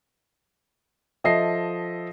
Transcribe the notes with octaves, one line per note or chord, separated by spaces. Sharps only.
F3 A4 D#5 E5 C7